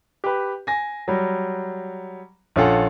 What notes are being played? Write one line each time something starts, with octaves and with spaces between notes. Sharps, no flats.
G4 B4
G#5 A#6
F#3 G3
A#1 C#4 F4 A4 F#5